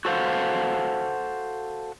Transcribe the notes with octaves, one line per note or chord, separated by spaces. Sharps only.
F#4 A4 C5 F5 F#5